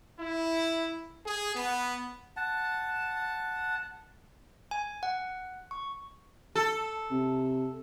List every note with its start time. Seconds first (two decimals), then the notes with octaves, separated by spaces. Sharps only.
0.20 E4
1.26 G#4
1.55 B3
2.36 F#5 A5
4.71 G#5
5.03 F#5
5.71 C#6
6.55 A4
7.11 C3